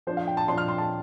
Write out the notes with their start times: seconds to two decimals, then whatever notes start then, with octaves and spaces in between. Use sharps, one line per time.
0.07 F3 D4 C5
0.17 F5
0.28 G5
0.37 A5
0.48 F3 D4 C6
0.58 F6
0.68 C6
0.78 A5